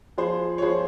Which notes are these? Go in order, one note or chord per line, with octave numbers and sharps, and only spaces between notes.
F3 G#4 C5
C#5
F3 G#4 C5